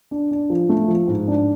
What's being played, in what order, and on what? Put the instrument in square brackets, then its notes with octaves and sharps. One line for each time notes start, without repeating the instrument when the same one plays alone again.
[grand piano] D4
D4
F3
A3
F3
G#2
D4